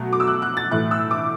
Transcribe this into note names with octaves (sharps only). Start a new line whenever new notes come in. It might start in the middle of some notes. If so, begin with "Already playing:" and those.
Already playing: B2 F#3 A3
D6
E6
F#6
F#6
A6
A2 E3 A3 F#6
E6
D6